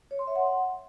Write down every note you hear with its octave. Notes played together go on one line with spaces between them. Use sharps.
C#5
C6
E5
F#5